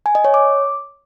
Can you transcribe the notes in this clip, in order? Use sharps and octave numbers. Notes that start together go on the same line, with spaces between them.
G#5
D#5
C#5
D6